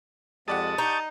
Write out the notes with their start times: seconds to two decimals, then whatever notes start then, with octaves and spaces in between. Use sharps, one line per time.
0.48 F2 G#3 G4 D5 F#5 A5 D#6
0.78 D#4 C#6 G6